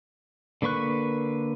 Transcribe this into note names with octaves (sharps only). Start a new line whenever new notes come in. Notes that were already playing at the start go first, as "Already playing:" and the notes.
D3 A#3 B4 C#6 F#6